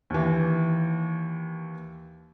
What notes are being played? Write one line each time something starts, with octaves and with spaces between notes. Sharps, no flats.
D#2 E3